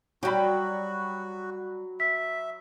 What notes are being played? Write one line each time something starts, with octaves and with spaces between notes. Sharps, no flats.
F#3 G3 F#4 G4 B5
E5 B6